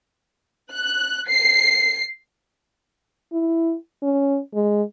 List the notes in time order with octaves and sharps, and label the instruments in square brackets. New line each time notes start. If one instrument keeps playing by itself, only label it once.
[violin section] F#6
C7
[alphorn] E4
C#4
G#3